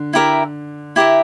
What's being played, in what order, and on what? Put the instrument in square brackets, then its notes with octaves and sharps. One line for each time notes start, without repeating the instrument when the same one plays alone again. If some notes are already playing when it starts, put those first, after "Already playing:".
Already playing: [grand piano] D3
[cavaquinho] E4 G4 A#4 E5
E4 G4 A#4 E5